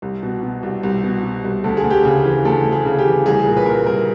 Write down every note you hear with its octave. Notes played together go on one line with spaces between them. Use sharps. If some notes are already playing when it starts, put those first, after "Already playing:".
C2
B2
B2
C2
C2
B2
B2
C2
D2 A4
G#4
D2
G4
C#3 G#4
E3
D2 A4
D2
G#4
C#3
G4
E3
C2 G#4
A#2 A#4
B4
A#2 A#4
C2 A#4